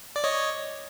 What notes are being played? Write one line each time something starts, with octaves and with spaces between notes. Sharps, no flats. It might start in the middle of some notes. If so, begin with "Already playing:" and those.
D5
C#5 D#5